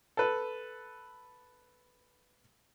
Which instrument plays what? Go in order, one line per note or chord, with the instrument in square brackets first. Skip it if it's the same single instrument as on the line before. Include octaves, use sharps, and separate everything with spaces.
[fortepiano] A4 B4